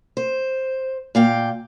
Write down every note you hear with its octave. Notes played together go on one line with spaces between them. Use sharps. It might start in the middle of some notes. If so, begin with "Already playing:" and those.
C5
A#2 F5 G5